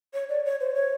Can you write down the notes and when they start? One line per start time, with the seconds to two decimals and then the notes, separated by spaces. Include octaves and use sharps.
0.14 C#5
0.29 D5
0.45 C#5
0.60 C5
0.75 C#5